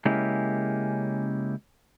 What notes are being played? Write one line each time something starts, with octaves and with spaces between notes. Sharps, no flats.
C#3 G#3 A#3 C#4 E4 G4